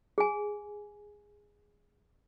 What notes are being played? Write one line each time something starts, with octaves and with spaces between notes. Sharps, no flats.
G#4 G#5